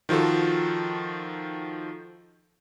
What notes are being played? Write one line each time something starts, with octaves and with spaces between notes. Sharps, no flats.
D#3 F3 F4 F#4 A4